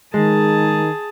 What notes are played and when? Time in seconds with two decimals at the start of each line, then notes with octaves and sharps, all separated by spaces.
0.14 D#3 G#3 G#4 A5